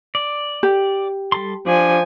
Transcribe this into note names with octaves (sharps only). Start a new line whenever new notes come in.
D5
G4
G3 A4 C6
F3 D4 G#5